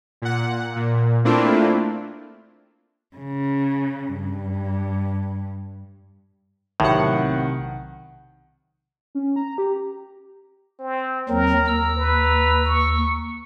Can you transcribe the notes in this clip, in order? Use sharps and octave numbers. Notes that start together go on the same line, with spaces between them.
A#2 F#5
A#2
A3 A#3 C4 D4 E4 F4
C#3
G2
B1 A2 C3 D#3 F#5
C#4
A#5
G4
C4
D#2 F#3 C4 A#4
D#2 A#5 E6
B4
C#6